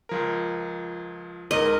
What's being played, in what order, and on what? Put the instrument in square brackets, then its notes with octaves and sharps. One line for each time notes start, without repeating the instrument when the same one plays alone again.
[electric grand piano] C#2 F3 A#4
[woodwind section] C#2 A#4 [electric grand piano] G#2 [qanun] D#5